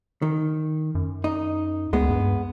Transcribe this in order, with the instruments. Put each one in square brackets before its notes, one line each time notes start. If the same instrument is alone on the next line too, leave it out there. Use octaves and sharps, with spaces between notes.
[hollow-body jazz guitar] D#3
[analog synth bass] F#2
[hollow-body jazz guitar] D#4
[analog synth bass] D2 [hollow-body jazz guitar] G#3 B3
[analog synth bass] G2